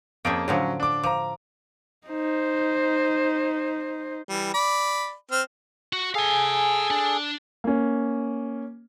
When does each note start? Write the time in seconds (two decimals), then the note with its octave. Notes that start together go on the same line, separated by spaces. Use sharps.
0.25 F2 A#3 C#4 G#4 G5 D7
0.48 A2 D3 F3 F#3 C#4
0.80 D4 D6
1.03 F3 A#5 D6
2.08 D#4 C5
4.29 E3 G3
4.54 D5 B5
5.31 C4 F6
5.93 F#4
6.15 G#4 A4 F5 G#5
6.91 D4
7.64 A#3 C#4